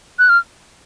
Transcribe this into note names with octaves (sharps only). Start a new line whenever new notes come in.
F#6
F6